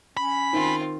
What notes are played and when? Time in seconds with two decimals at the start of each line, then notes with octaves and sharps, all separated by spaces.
0.17 C#4 B5
0.53 D#3 C4 F4